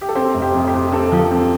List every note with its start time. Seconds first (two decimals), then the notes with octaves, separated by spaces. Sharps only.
0.01 G4
0.09 A4
0.15 C4 G4 C5
0.34 F1
0.42 G4 C5
0.55 F2
0.67 G4 C5
0.74 F2
0.88 G4
0.92 C4 A4
1.12 F3
1.19 A4
1.31 C4